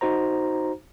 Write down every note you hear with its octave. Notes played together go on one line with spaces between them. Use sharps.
D#4 F#4 C5 A#5